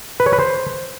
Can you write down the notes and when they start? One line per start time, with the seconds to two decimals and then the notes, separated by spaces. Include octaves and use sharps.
0.20 B4
0.26 C#5
0.33 B4
0.39 C5